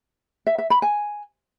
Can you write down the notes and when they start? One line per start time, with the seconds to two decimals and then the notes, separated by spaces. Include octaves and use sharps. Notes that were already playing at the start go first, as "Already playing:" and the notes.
0.47 E5
0.58 E5
0.70 B5
0.82 G#5